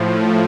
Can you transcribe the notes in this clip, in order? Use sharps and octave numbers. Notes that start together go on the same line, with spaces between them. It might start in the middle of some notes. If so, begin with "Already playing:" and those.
Already playing: A2 F3